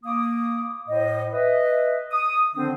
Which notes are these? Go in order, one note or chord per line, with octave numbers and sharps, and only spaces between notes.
A#3 D6 D#6
A2 C5 D#5
B4 D#5 E5
D#6
D3 D#3 F3 B3 C4 D4